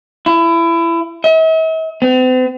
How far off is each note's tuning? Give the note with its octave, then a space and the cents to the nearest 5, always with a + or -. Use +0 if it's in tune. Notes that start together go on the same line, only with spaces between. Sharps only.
E4 +25
E5 -45
C4 -45